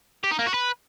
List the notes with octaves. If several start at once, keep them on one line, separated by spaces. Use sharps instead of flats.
G4
D#4
A#3
F#4
B4